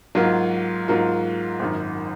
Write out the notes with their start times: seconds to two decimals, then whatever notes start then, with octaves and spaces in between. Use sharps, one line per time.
0.15 G#2 F#3 A#3 F4
0.88 G#2 F#3 A#3 F4
1.59 G#1 F#2 D#3